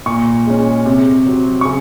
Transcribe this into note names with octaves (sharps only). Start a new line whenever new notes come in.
A#2 C#6
G#3 C#4
C3
F#3 C4
C#6
C#3